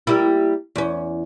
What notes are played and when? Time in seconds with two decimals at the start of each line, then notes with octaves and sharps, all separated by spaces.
0.07 G3 A#3 E4
0.76 E2 C#4